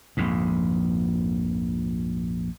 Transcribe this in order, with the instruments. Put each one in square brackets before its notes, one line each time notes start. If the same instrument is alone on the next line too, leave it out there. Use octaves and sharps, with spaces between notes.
[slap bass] A#1 F2 G#2